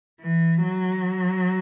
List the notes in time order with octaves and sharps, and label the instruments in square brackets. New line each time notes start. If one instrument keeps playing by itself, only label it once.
[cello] E3
F#3